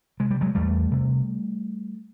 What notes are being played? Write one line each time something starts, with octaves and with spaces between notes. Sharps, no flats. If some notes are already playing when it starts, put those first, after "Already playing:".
C3 G#3
G3
F#3 G#3
E2 G3 A3
C3